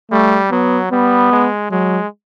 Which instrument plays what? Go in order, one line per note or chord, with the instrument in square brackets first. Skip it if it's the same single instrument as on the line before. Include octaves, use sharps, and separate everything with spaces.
[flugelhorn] G3 [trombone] A3
[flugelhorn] F#3 [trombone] B3
[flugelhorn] G3 [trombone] B3
[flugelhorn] G#3
[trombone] F#3 [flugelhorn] G#3